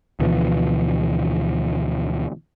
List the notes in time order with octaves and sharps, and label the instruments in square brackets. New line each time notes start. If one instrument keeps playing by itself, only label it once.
[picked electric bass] D2 B2 E3 F3